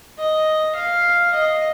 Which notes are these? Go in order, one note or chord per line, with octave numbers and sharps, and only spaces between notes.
D#5
F5
D#5